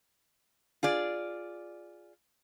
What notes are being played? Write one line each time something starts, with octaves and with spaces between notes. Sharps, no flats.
F4 G#4 D5